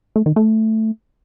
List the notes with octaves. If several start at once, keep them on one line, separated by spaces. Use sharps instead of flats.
A3
D#3
A3